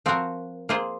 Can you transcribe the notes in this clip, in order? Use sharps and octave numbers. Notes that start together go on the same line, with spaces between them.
F3 C4 F#4 A#4
A#3 F4 G#4 C5